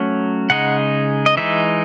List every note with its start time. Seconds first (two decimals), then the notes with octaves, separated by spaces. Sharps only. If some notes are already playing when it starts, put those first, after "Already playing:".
Already playing: F#3 A3 C#4
0.50 C#3 G#3 D#4 F#5
1.26 D#5
1.37 E3 G#3 D#4 E5